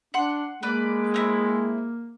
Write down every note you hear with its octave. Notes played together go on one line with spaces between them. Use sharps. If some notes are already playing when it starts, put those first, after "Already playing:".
D4 F#5 C6
G#3 A#3 B4 D5
C4 D#4 E4